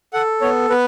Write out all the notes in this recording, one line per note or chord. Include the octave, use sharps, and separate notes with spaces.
A4 F#5
B3 C#5
B3 B4